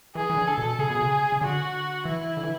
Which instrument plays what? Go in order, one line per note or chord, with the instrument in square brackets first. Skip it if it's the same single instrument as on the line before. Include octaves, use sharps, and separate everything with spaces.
[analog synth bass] E3 [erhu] G#4
[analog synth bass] E3
D3
[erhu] A4
[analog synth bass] B2
[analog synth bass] C#3 [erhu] G#4
[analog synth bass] B2
C#3
C#3
[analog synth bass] D3 [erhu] F#4
[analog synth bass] E3 [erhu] E4
[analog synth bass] D3
E3